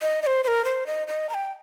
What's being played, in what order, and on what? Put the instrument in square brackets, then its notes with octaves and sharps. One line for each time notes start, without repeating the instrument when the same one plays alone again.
[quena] D#5
D#5
C5
C5
A#4
C5
D#5
D#5
A#5
G5